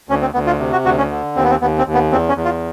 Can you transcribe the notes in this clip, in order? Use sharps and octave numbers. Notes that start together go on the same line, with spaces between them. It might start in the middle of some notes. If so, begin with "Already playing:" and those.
D2 C#4
C4
D2 B3
F4
C3
F#4
D2 F#4
C#4
D3
D#2 C4
B3
C4
D#2 B3
C4
D#2
B3
E2 C4
C#4
E2
F4